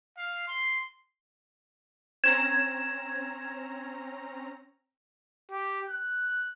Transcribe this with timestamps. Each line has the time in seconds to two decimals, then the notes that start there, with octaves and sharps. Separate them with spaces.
0.17 F5
0.48 C6
2.24 C4 C#4 A#5 G#6 E7
5.51 G4
5.89 F#6